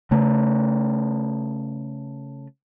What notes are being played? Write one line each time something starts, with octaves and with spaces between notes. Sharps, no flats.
C#3 A3